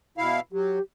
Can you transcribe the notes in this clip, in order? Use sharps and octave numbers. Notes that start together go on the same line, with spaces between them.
B2 E4 F5
F#3 G4